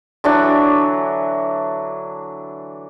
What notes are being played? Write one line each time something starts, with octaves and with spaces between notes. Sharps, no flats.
D3 E3 F#3 D4